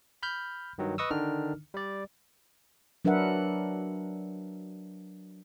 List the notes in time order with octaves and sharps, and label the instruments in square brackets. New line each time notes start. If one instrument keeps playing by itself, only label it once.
[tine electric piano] B5 F6 G6
G2 D#3 F#3
B4 D#5 C#6 D#6 E6
D3 D#3 D4 D#4 F6
G3 D5
[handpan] F#3 D4 A#4 B4 E5 F#5